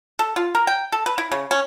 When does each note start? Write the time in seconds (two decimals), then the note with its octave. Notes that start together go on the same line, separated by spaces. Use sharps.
0.19 A4
0.36 F4
0.55 A#4
0.67 G5
0.92 A4
1.06 B4
1.18 E4
1.32 C#3
1.51 C#4